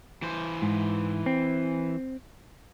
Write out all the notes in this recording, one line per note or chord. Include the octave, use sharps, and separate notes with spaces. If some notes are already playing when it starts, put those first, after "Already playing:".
E3 C5
G#2
C4